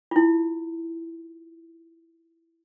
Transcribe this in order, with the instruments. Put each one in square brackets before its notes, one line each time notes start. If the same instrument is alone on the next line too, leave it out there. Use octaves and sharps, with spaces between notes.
[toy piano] E4 F4